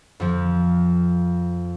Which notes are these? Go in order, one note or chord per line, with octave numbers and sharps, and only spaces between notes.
F2 F3